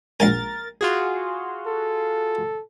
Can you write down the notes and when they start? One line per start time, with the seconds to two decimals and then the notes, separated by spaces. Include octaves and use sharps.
0.20 A#1 G#2 A#4 G#5 A6
0.81 F4 F#4 G#4
1.67 A4